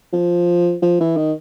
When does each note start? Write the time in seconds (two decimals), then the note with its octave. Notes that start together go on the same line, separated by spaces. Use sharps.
0.13 F3
0.82 F3
1.00 E3
1.17 D#3